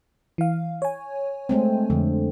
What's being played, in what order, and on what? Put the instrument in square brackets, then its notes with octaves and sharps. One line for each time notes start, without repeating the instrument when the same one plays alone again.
[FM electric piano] E3 F5
C#5 G#5
[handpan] G#3 A3 C4
[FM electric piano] F2 [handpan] D3